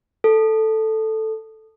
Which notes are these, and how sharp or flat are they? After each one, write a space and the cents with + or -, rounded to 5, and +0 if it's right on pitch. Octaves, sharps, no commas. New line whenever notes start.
A4 +0